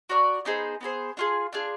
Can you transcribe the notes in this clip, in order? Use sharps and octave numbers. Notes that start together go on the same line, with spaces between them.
F#4 A#4 D5
B3 D#4 G#4 C5
B3 D#4 G#4 C5
D4 F4 G#4
D4 F4 G#4